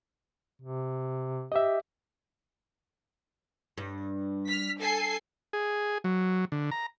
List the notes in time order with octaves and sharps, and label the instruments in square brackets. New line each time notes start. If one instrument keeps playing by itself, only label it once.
[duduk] C3
[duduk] G4 [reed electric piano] D#5 E5
[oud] G2
[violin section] F6 B6
A4 G#5 C7
[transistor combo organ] G#4
F#3
D3
A#5